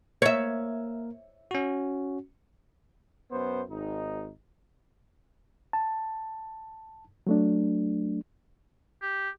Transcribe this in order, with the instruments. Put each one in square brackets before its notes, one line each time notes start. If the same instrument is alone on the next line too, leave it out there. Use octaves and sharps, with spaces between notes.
[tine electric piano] A#3 A#4 [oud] C#5 E5
[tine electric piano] C#4 F#4
[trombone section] F#2 B3 C5
G#1 D#4
[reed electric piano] A5
F#3 A3 D4
[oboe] G4